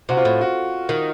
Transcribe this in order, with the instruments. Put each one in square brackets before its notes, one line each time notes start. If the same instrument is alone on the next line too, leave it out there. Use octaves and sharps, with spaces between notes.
[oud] C3 [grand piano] F#4
[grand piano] F4
[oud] A2
[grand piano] F#4
[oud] D#3